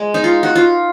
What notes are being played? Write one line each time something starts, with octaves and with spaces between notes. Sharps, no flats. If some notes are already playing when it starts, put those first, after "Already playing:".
Already playing: G#3
D#4
F4
F#4
F4